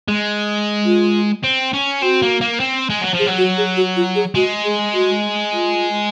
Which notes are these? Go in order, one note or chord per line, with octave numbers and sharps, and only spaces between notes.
G#3
F4
C4
C#4
C4 F#4
A#3
A#3
C4
G#3
F#3
F3 G#4
F#3
F#4
G#4
F#4
F4
G#4
G#3 F#4
G#4
F#4
F4